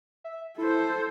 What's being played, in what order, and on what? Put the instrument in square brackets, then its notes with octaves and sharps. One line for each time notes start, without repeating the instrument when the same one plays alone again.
[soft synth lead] E5
[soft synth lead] E4 [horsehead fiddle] A4 C5